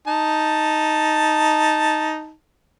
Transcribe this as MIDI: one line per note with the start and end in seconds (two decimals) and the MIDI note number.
0.08 2.31 63
0.08 2.31 81